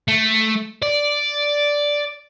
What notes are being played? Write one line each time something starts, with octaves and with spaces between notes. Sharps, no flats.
A3
D5